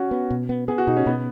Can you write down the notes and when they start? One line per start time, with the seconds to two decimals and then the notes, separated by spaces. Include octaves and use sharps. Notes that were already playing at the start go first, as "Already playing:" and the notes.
Already playing: C#4 F#4
0.11 B3
0.31 B2
0.49 B3
0.68 B3 G#4
0.78 F#4
0.87 B2 D#4
0.96 C#4
1.06 B2 B3